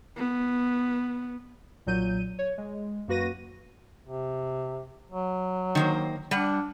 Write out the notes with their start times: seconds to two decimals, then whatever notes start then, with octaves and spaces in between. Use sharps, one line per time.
0.17 B3
1.86 B1 A#2 F#3 G6 D#7
2.39 C#5
2.58 G#3
3.08 F#2 A#3 F#4 B4 A#6 D#7
4.05 C3
5.10 F#3
5.75 D#3 A#3 C5
6.31 G3 D4 F#5